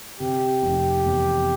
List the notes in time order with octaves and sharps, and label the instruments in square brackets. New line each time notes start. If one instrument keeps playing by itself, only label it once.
[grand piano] C3 [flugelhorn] G4
[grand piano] F1
E2